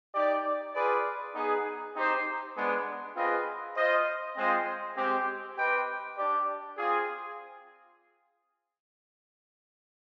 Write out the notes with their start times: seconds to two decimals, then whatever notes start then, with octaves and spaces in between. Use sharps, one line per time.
0.14 D#4 G4 D5
0.74 F4 G#4 B4 D5
1.35 B3 D#4 G#4
1.95 C4 D#4 G4 C5
2.55 G#3 B3 D4
3.16 C4 F4 G#4 B4 D#5
3.76 F4 C5 D#5
4.37 G#3 C4 F4 C5 D#5
4.97 G#3 C4 G4
5.57 C4 G4 B4 D#5 G5
6.18 D4 G4 D5
6.78 C4 F4 G#4